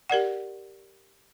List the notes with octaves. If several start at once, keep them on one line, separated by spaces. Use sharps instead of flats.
G4 A#4 D5 F#5